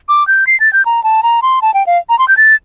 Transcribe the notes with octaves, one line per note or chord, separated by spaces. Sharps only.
D6
G6
C7
A6
G6
A#5
A5
A#5
C6
A5
G5
F5
A#5
C6
G6
A6